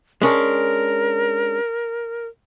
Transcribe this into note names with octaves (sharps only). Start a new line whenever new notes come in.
G#3 C#4 D4 A#4